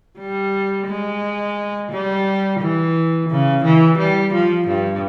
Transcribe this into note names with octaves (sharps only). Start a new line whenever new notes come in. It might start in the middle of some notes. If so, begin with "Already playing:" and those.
G3
G#3
G3
E3
C#3
E3
G3
F3
G2